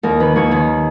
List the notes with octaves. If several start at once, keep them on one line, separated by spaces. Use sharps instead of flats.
D#2 A#4
D#3 B4
D#2 C#5
D#3